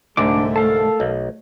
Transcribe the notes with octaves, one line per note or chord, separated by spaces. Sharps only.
C2 G#2 D3 A3 D4 D6
A4 A#4 F5 A5
B1